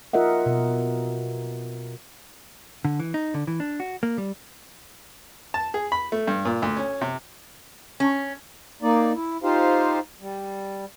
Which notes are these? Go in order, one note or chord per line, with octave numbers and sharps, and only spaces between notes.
F4 A#4 D#5 E5 F#5
B2
D3
E3
D#4
D3
E3
D4
F#4
A#3
G3
A5
G#4
B5
A3
G2
A#2
D2
C#4
C3
C#4
A#3 D#4 D5
E4
D#4 F4 G4 C5 F5
G3